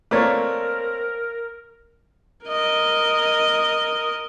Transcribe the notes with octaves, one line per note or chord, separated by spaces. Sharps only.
A3 A#3 C4 A#4 C#5 D5
A#4 D#5